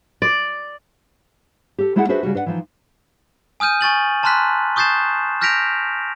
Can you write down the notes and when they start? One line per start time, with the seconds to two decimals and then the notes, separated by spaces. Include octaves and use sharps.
0.22 D5
1.78 G4 A4
1.96 G#3 A3 E4 F#4 G#4 F#5
2.09 D4 F#4 G#4 B4 C5 E5
2.23 C#3 G3 F#4
2.34 D4 B4 D5 F#5
2.46 E3 F3 D#4
3.60 G#5 D#6 F6 G6 D#7
3.81 G#5 C#6 A6 F#7
4.23 A5 A#5 C6 F6 F#6 B6
4.76 C#6 D#6 G6 A6 C7 E7
5.41 F6 G6 A#6 B6 D7 F7